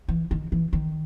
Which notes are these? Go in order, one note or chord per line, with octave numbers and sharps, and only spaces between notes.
E3
D#3
E3
D#3